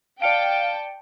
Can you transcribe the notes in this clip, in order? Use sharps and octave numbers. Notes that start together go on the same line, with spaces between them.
D5 F5 G5 A5 C#7 D7